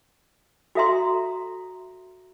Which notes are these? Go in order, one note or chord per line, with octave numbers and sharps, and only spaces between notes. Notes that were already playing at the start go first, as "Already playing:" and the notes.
F#4 A4 E5 A#5 C6